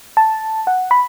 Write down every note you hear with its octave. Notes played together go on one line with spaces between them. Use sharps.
A5
F#5
B5